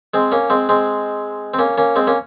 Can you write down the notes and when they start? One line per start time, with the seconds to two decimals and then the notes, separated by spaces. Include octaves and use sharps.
0.14 G#3 C4
0.32 A#3 C#4
0.50 G#3 C4
0.69 G#3 C4
1.54 C4
1.59 A#3 C#4
1.78 A#3 C#4
1.96 G#3 C4
2.07 A#3 C#4